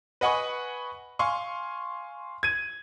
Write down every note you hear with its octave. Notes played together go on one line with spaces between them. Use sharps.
B4 D#5 F#5 G#5 B5 C#6
F5 G#5 C6 C#6
G#6 D#7